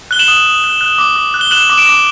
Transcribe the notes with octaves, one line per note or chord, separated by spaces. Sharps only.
F#6 G7
E7 F#7
D#6
D#6
F#6
F#6
D6
D6
F#6
G7
F#6 E7 F#7
D6
D7 E7
D6